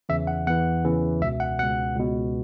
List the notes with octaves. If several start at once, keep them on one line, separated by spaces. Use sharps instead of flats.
E2 C#3 E3 E5
F#5
E2 E3 F#5
E2 C#3 E3
C#2 B2 E5
F#5
C#2 B2 F#5
C#2 B2